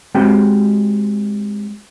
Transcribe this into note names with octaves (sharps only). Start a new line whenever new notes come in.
G#3 C4 F#4 G4 G5